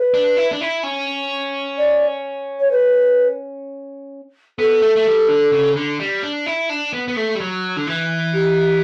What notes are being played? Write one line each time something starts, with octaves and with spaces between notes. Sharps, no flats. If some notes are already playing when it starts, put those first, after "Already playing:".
Already playing: B4
D4
E4
D4
E4
C#4
D5
C#5
B4
B3 A4
A3
A3
G3
D3
C#3
D3
G3
D4
E4
D4
B3
B3
A3
G3
F#3
D3
E3
G4